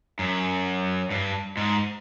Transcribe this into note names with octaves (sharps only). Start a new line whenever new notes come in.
F#2
G2
G#2